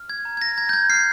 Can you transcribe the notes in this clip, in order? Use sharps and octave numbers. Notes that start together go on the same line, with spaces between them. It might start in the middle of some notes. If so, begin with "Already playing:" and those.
Already playing: F6
G#6
A#5
G#6
A#6
A#5 G#6
G6
G#6
F6 C7